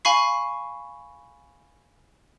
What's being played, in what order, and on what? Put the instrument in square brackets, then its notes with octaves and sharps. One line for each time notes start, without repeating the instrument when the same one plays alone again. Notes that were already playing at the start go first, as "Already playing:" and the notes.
[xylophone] F5 G#5 B5 C#6 C7